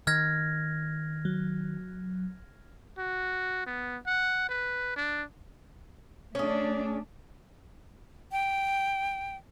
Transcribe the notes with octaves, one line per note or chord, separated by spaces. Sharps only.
D#3 F6 G#6 A#6
F#3
F#4
B3
F#5
B4
D4
A3 C#4 D4 G#4
G5